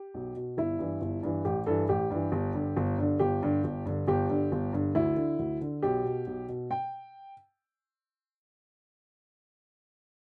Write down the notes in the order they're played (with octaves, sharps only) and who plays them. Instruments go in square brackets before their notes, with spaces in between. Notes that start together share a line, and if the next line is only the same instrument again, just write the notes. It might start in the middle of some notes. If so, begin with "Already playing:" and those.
Already playing: [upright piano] G4
B1
B2
G1 E4
G2 E3
G1
G2 E3
A1 G4
G2 E3 A4
A1 G4
G2 E3
G1
G2 D3
G1
G2 D3
G1 G4
G2 D3
G1
G2 D3
G1 G4
G2 D3
G1
G2 D3
D2 E4
D3
D2
D3
B1 G4
B2
B1
B2
G5